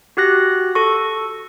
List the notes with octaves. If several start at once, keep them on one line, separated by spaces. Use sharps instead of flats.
F#4 G4 F#6 A#6
A4 C#6